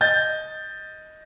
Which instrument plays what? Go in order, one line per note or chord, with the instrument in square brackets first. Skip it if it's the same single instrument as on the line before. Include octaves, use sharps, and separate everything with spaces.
[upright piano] D#5 G6 A6